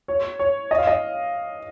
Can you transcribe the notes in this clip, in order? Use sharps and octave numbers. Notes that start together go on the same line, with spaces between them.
C#5
C#5
D#5
F5
D#5